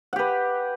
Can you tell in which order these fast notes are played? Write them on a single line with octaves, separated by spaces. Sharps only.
F#5 G4 B4